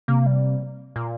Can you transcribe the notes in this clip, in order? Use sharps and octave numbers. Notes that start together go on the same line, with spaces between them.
C3 A#3
G3
A#2